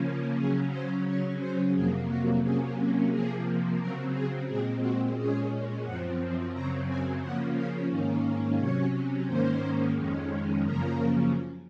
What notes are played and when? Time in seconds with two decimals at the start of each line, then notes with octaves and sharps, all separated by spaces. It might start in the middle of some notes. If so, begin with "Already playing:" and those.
Already playing: C#3 F3 A#3 C#4
0.36 C#3 F#3 C#4 G#4
0.70 C5
1.04 C#3 F#3 C#4 C#5
1.39 C5
1.73 F2 C3 F#3 A#3 G#4
2.08 F#4
2.42 C3 F#3 A#3 C#4 G#4
3.10 C3 F3 A#3 G#4
3.79 C#3 F#3 C4 A#4
4.13 G#4
4.47 A#2 G#3 C4 G#4
4.81 F#4
5.15 A#2 G#3 C#4 G#4
5.84 F#2 F3 C4 F#5
6.53 F#2 C#3 F#3 C4 A#5
6.87 G#5
7.21 C#3 F3 A#3 C#4 F#5
7.56 F5
7.89 G#2 D#3 A#3 C#4
8.58 C3 F#3 C#4 C#5
9.26 G#2 D#3 A#3 C#4 C5
9.95 F2 D#3 G#3 C#4
10.63 F#2 C#3 F3 A#3 C#4 A#4